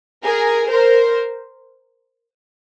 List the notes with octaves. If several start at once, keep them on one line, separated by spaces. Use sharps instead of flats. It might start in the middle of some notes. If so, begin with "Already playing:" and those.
G#4 A#4
A#4 C5